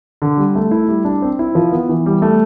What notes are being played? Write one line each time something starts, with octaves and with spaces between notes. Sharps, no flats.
D3
G3
A3
E4
G3
D4
C4
E4
F3
B3
E3
G3
A3